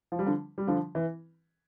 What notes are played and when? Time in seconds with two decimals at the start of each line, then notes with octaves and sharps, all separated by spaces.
0.12 F3
0.19 G3
0.26 D3 F3
0.58 G3
0.67 D3 F3
0.95 E3